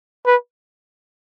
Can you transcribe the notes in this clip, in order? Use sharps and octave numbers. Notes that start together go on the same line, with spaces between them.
B4